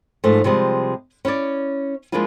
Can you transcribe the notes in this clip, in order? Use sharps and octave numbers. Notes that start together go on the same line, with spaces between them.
G#2 F3 A3
C3 F3 G3 G#3
C#4 E4 C#5 D5
F3 G#3 A#3 D4 E4 F4